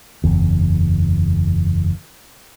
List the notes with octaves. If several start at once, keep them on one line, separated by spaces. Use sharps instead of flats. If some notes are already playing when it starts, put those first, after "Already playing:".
F#1 E2